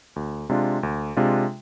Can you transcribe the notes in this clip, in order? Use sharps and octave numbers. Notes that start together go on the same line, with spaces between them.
D2
C3 G#3 D4 F4
D2
C3 G#3 D4 F4